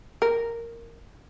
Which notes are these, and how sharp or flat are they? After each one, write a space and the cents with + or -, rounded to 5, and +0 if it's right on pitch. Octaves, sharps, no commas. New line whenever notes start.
A#4 -5